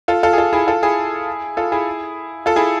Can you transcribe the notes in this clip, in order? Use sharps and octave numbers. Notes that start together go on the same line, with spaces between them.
F4 A4
F4 A4
G#4
F4 A4
E4 G#4
F4 A4
E4 G#4
F4 A4
E4 G#4
F4 A4
E4 G#4